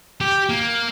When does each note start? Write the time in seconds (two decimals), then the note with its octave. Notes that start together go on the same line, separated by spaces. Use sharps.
0.21 G4
0.49 A#3